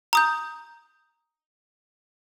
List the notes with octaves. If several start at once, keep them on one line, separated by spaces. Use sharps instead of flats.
A#5 D#6 G6